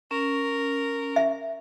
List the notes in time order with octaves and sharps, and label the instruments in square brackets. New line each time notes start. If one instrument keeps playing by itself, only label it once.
[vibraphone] C#4 [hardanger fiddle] A#4
[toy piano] E5